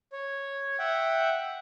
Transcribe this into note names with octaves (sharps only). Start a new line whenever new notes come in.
C#5
E5 F#5 G5